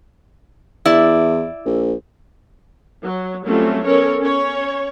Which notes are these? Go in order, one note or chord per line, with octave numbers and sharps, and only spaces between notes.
E2 E4 D5
A#1
F#3
F#3 G3 A3 C4 C#4 F4
B3 C#4 A4 A#4 C#5
C#4 C#5